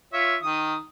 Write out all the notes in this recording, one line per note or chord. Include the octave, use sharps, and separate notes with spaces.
F4 C#5 E5
D#3 D#6